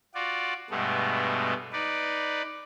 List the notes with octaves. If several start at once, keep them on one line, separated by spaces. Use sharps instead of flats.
F4 F#4 D5
G2 B2 G#3 A3 B3
D#4 B4 D5